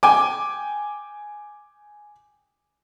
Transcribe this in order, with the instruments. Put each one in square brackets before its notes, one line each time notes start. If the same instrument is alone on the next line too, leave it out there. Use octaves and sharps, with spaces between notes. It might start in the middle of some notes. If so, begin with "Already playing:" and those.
[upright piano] G5 G#5 D6